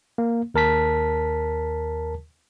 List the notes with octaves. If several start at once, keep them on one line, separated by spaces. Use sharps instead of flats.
A#3
D#2 A#4 A5 B6